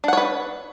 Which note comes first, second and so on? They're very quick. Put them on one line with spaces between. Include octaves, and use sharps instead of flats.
D4 F#5 C#5 B4